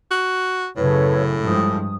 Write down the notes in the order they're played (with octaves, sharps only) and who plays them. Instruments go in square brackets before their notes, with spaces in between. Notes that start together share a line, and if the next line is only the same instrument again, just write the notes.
[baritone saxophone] F#4
[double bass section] F#2 C#3 [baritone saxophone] A2 [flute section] A4 B4 C#5
[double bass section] G2 F3 G#3 [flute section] D#6